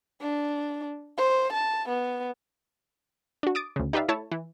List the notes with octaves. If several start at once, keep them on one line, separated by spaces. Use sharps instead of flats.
D4
C5
A5
B3
D4 F#4
D6 D#6 A6 D7
D2 C#3
D#4 G4 B4 D5 E5 F5
A3 E4 C#5 A5
E3